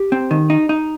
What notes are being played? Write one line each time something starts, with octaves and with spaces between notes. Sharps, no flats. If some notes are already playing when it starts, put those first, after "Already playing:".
Already playing: G4
C4
D#3
D#4
D#4